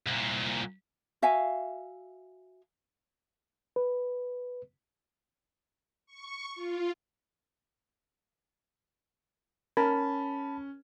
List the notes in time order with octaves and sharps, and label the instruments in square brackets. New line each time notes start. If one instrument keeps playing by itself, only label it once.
[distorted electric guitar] C2 A#2
[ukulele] F#4 E5 F5 G#5
[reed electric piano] B4
[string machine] C#6
F4
[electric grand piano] C#4 [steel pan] A#4 [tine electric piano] A5 B5